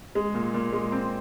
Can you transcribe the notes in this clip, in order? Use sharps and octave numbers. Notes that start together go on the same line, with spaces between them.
G#3
A#2
A#2
G#3
C4